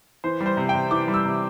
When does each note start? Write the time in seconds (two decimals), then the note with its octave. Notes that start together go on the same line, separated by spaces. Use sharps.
0.24 E3 C5
0.41 G3
0.46 C5
0.57 C3
0.69 G5
0.75 C3
0.91 E3 D6
1.08 G3
1.14 E6
1.25 C3